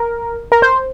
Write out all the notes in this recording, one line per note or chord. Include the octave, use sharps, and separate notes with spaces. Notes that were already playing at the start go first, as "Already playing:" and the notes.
Already playing: A#4
A#4
C5